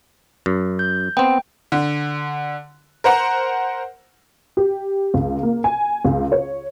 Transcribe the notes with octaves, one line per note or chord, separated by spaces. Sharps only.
F#2
G6
B3 C4 G5
D3
A#4 C5 F#5 A#5
G4
C#2
A#3
G#5
C#2
C#5